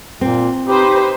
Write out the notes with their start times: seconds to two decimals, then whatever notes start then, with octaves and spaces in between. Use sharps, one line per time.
0.21 A#2 C4
0.67 D#4 G4 B4 C5